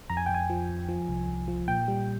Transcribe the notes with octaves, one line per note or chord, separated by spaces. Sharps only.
F2 A#5
G#5
F2 G5
G#5
F3
F2
F3
C2
C2
F3
A#2 G5
G3